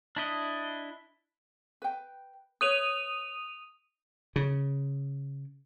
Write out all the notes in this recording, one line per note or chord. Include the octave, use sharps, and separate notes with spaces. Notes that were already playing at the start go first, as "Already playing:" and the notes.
D4 E4 D#5
B4 G5
B4 C#5 D#6 D#7 F7
C#3